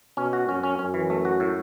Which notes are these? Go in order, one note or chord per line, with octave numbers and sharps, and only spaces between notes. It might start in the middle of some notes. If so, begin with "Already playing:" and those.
B2 C#4
F#4
F#2 C#4
C#4
F#2 C#4
E3
A3
F#4
A2